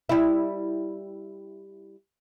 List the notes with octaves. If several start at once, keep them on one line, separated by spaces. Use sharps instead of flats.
G3 E4